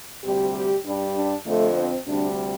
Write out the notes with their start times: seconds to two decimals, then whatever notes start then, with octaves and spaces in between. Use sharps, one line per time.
0.24 D2 C3 G3 G4
0.54 G4
0.85 G2 G3 D4
1.15 D4
1.45 F2 D3 F3 A3
1.76 C4
2.06 D2 C3 G3 D4